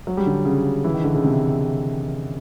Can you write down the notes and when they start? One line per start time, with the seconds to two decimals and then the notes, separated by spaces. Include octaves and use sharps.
0.07 F#3
0.17 G3
0.26 D3
0.45 C#3
0.84 E3
0.94 D#3
1.04 D3
1.15 C#3
1.24 C3